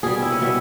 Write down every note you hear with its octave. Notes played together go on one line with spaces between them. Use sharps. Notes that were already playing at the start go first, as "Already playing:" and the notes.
B2 G3 G#4
E4
C#4
B2 G3 E4